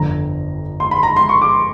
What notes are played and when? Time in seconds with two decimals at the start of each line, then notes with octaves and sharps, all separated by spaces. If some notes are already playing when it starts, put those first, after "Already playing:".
Already playing: G1 F2 D3 A#5
0.80 C6
0.91 B5
1.03 A#5
1.16 C6
1.29 C#6
1.42 D6